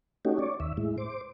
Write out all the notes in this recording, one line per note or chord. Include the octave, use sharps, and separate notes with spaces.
A3 C#4 D#4 F#4 G4
C#5 D5
D#2 E5
A2 G#3 E4
C5 D6